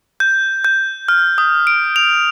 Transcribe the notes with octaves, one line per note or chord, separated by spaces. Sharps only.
G6
G6
F6
D#6
D7
F7